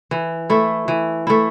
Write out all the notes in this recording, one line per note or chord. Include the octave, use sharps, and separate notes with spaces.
E3
A3 E4
E3
A3 E4